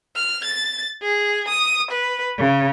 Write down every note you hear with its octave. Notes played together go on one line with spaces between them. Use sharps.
F6
A6
G#4
D#6
B4
C#3